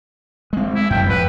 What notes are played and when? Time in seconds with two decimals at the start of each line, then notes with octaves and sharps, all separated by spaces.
0.53 G#3 C4
0.75 E4
0.90 F#2 G5
1.09 F2 F3 B4